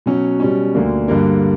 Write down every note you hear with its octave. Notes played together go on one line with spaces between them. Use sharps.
B2 F#3 C#4
B2 G3 C#4
D2 D3 A#3
G2 D3 G3 A#3